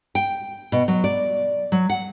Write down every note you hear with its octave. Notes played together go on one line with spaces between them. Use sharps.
G5
B2
F#3
D5
F#3
F#5